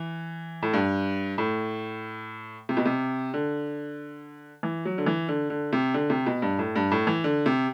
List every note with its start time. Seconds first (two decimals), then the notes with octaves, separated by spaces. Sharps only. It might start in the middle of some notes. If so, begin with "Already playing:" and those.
Already playing: E3
0.63 A2
0.74 G2
1.38 A2
2.69 C3
2.77 B2
2.85 C3
3.34 D3
4.63 E3
4.85 F#3
4.98 D3
5.06 E3
5.28 D3
5.50 D3
5.73 C3
5.94 D3
6.10 C3
6.26 B2
6.42 G2
6.59 A2
6.76 G2
6.92 A2
7.07 E3
7.24 D3
7.46 C3